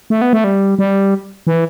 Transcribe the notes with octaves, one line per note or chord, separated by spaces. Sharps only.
A3
B3
A3
G3
G3
E3